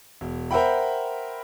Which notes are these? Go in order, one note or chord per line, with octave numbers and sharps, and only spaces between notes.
E1
A#4 C5 E5 F#5 G5 B5